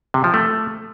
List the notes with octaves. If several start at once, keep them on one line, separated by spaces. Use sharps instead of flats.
C3
F3
A3